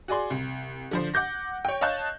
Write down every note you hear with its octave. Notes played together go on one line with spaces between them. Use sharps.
F#4 G#4 D5 C6
C2
D3 F3 C5
F#5 D6 G6 A#6
C#5 G5
C#5 D#5 F5 A5 F#6 G6